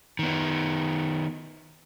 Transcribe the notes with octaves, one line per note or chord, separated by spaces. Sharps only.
D#3 B3